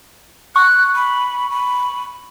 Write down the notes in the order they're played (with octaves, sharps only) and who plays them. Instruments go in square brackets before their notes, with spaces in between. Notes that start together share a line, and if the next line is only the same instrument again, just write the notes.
[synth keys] C#6 [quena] F#6
[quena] B5
B5